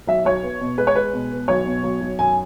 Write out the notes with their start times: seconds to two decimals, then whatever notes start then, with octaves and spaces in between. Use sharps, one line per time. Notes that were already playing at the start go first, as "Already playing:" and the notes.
0.07 B1 E5
0.25 B1 C#5
0.43 B3
0.61 B2
0.78 G#3 B4
0.87 C#5
0.95 G#3 B4
1.13 B2
1.32 B3
1.48 B1 C#5
1.66 B2
1.83 B1
2.01 B1
2.19 F#2 G#5